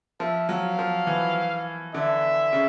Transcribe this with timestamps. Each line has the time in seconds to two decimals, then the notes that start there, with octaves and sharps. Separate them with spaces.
0.20 F3 E5
0.49 F#3 F5
0.79 F3
1.07 E3
1.94 D3 E5
2.53 C#3